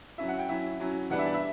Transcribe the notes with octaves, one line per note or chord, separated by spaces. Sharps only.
F#3 C#4 E4 E5
F#5
G5
F#3 C#4 E4 E5
F#3 C#4 E4
E3 G3 B3 D4 F#5
E5
D5
E5